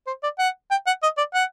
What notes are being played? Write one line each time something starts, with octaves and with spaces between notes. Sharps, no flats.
C5
D5
F#5
G5
F#5
D#5
D5
F#5